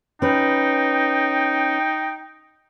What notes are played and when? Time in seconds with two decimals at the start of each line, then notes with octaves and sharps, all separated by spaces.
0.22 C#4 D#4 B4 G5